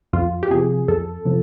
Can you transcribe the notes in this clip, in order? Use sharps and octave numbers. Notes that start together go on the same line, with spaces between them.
F2 F4
G4
C3 F3 G#4
F2 A4
C3 F3